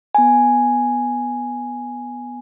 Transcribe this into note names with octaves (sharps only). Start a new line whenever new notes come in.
B3 G#5